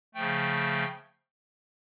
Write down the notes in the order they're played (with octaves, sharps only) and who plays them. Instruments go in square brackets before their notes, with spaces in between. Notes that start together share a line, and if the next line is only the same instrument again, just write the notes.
[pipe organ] C#3 F3 A3 G5